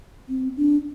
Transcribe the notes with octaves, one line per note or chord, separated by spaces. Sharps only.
C4
D4